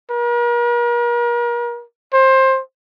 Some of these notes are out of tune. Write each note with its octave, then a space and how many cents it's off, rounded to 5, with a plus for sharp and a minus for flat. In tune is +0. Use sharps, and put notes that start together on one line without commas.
A#4 +40
C5 +20